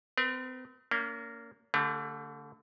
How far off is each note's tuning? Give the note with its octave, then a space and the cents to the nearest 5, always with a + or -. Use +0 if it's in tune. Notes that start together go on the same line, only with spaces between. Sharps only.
C4 -40 A#4 +40
A#3 -15 C#4 +40
D3 -25 A3 +25 G4 +45